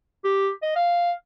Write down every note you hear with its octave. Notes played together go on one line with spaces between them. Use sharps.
G4
D#5
F5